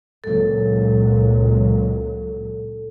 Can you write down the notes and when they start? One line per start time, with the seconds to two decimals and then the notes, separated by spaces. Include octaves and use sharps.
0.24 C#2 A#2 F#3 A4